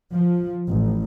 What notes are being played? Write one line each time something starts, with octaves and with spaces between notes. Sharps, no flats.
F3
A1